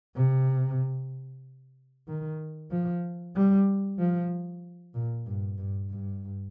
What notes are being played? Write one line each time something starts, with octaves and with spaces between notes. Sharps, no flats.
C3
D#3
F3
G3
F3
A#2
G2
G2
G2